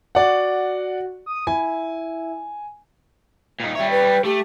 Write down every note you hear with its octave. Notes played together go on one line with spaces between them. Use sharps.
F#4 D5 F#5
D#6
E4 G#5
A#2 D#4
G3 C#5 E5
B4
A3 G4